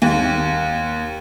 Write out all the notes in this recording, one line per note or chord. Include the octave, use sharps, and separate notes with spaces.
D#2